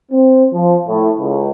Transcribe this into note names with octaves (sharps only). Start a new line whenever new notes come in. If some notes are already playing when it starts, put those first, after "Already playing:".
C4
F3
A2
C#2